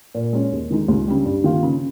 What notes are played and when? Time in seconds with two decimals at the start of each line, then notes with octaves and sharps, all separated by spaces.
0.15 A#2
0.33 G#3 C#4
0.52 D#2
0.70 D#3 G#3 D#4
0.88 C#2
1.07 C#3 G3
1.25 G2
1.44 D#3 A#3 F4
1.63 C#3